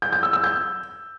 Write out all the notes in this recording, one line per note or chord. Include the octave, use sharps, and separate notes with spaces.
G6
G6
E6
E6
G6